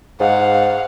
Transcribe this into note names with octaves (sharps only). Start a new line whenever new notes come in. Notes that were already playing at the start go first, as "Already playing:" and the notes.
G#2 F5 F#5